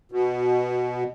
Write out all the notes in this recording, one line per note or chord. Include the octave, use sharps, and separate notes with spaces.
B2